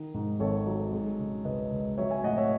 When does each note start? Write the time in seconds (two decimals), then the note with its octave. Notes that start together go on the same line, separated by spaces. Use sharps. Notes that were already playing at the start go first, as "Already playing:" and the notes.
Already playing: D#3
0.14 G#2
0.39 G#1 A4 C#5
0.67 F#3
0.92 G#3
1.19 C#3
1.45 C#2 B4 D#5
1.72 C#2
1.98 F#3 C#5 E5
2.11 E5 G#5
2.24 A2 D#5 F#5
2.37 C#5 E5